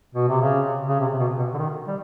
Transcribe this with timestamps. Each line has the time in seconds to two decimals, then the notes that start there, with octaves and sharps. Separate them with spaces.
0.15 B2
0.28 C3
0.42 C#3
0.89 C#3
1.00 C3
1.13 C3
1.19 B2
1.39 B2
1.54 D3
1.58 D#3
1.87 G3